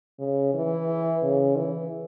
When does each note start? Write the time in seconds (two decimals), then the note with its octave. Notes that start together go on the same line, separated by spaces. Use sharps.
0.20 C#3
0.54 E3
1.22 C#3
1.56 E3